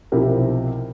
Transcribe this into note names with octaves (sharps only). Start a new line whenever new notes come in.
B1 C3 F3 E4 G4 A#4